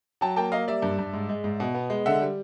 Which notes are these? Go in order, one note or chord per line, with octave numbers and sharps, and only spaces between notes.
F#3 G5 A5
A#3 G5 A5
A#3 D#5 F5
G3 D5 E5
G2
G2
G#2
G#3
G#2
B2
B3
G#3
D3 E5 F#5
G3